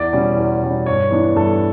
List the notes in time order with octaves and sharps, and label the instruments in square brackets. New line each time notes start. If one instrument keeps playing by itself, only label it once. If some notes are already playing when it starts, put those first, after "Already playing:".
Already playing: [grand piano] E2 D5
B2 G3 C#4
E2
B2 G3 C#4
G2 C#5
E3 B3 D4
G2 A4